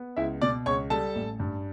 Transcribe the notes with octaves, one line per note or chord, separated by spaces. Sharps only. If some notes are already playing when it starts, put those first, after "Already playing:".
Already playing: B3
C#2 E4 E5
B2 D5 D6
C#2 C#5 C#6
G3 A4 A5
A1
G2